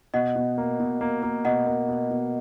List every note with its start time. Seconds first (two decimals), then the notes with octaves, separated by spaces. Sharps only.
0.14 B2 D#5 F#5
0.35 B2
0.58 A#3
0.80 B2
1.01 A#3
1.23 A#3
1.45 B2 D#5 F#5
1.67 A#3
1.89 B2
2.10 B2